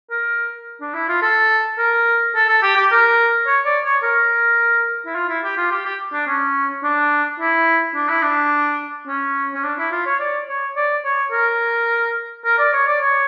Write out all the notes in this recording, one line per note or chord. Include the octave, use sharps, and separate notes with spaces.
A#4
D4
E4
F4
A4
A#4
A4
A4
G4
G4
A#4
C#5
D5
C#5
A#4
E4
F4
E4
G4
F4
G4
G4
D4
C#4
D4
E4
D4
E4
D4
C#4
C#4
D4
E4
F4
C#5
D5
C#5
D5
C#5
A#4
A#4
D5
C#5
D5
C#5